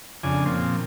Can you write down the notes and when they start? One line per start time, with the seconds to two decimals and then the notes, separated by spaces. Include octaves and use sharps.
0.23 F2 C#3 D4 G#5
0.45 A#2 F3 C4